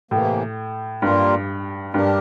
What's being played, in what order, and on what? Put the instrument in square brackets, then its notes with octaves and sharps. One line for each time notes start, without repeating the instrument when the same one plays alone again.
[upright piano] A2 [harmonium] C3 E3 A#3
[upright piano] G2 [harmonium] G3 A#3 F4 A#4
[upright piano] G2 [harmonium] G3 D4 G4 A#4